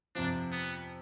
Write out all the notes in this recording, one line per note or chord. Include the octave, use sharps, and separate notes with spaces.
F2 C3 F3 D4
B3